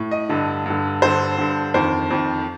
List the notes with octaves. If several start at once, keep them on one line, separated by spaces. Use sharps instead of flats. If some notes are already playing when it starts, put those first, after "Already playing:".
Already playing: A2
D#5
G2 D3
G2 D3
G2 D3 C5
G2 D3
F2 D#3 C5
F2 D#3